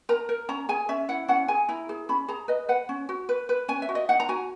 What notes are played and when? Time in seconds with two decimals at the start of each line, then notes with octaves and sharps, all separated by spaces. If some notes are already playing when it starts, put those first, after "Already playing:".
0.09 A#4 A#5
0.29 A#4
0.49 C#4 A#5
0.69 G#4 G#5
0.89 C#4 E5
1.09 E4 F#5
1.28 C#4 F#5
1.48 G#4 G#5
1.69 E4 A#5
1.89 G#4
2.09 C#4 B5
2.28 G#4 A#5
2.48 B4 D#5
2.69 B4 F#5
2.89 C#4
3.09 F#4
3.29 B4
3.49 B4
3.68 C#4 G#5
3.82 E5
3.89 F#4
3.95 D#5
4.09 D#4 F#5
4.20 A#5
4.29 F#4 G#5